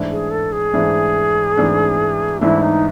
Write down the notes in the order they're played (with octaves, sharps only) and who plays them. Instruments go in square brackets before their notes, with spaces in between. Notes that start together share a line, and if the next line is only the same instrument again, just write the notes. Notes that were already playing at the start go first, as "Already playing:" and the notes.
Already playing: [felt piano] G#2 E3 A3 D4
[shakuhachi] G#4
A4
G#4
[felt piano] G#2 E3 A3 D4
G#2 E3 A3 D4
[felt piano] G#2 E3 A3 D4 [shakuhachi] E4
[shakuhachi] D#4